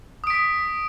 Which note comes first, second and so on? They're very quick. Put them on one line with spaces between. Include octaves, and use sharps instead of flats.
D#6 D7 B6